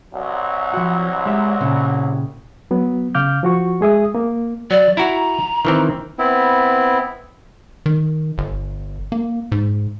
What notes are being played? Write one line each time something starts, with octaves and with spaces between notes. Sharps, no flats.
C2 F#3
F3 F#4
G#3 G4 E5
A#2 C#3
F#3 B3
C#3 F5 D6 F6 G6
F3 F#4 C#6
G#3 G#4 E5 D#6
A#3
F#3 D5
E4 F#4 A#5
D#3 E3 C4
B3 C4 E4
D#3
G1
A#3
G#2